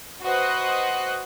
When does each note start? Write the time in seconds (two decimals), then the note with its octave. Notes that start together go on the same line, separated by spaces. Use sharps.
0.22 F#4 B4 C5 D#5 F#6